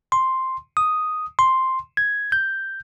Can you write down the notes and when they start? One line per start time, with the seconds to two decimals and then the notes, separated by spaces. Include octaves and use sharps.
0.12 C6
0.77 D#6
1.39 C6
1.97 G#6
2.32 G6